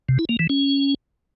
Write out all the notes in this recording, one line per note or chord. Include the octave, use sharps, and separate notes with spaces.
C3
E4
A#3
E3
C#4